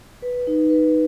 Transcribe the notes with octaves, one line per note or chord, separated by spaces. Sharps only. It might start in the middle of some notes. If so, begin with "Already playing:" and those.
B4
D#4
B4